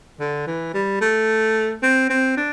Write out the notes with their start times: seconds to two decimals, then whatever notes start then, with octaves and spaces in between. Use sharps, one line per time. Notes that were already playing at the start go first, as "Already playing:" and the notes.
0.20 D3
0.47 E3
0.74 G3
1.01 A3
1.83 C4
2.10 C4
2.37 D4